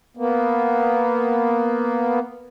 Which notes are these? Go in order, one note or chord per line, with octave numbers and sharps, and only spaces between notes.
A#3 B3